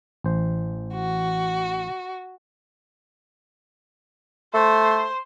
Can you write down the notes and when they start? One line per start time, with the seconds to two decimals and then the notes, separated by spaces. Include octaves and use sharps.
0.24 A1 C5
0.95 F#4
4.54 A3 C5